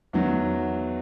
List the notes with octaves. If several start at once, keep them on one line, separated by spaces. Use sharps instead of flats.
E2 D#3 F#3